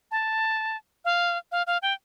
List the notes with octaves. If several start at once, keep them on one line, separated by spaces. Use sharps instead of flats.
A5
F5
F5
F5
G5